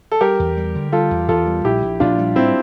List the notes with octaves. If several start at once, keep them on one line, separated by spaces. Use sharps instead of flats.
A4
G3 G4 A#4
E2
G3
D3
G3 F4 A4
E2
E2 F4 A4
G3
A#1 E4 G4
A#1
A#1 D4 F4
G3
A2 C4 E4